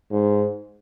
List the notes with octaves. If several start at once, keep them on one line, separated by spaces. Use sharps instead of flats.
G#2